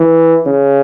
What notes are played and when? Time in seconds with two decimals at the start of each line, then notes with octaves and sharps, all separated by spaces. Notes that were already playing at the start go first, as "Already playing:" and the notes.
Already playing: E3
0.47 C#3